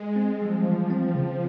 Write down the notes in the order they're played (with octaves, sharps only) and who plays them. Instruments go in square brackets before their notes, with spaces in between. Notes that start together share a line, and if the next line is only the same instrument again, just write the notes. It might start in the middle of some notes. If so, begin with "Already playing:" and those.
Already playing: [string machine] G#3
[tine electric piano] C4
[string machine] F3 [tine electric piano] G3
[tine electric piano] E3
C4
C#3